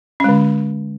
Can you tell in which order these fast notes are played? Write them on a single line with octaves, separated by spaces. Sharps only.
C#4 G#3 D3